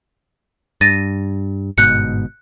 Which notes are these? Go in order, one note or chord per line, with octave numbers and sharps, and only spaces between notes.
G2 A6 A#6 D#7
G1 G#2 B2 F#6 G6 C#7